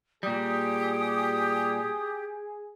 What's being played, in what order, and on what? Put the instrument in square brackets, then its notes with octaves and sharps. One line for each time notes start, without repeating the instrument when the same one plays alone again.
[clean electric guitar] A#2 G3 [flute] G4 [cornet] G#4 [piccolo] D#6